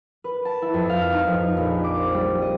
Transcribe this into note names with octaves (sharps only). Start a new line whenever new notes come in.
B4
A5
E4
F2
F5
D#4
F2
A#1
D6
C5
G3
D#5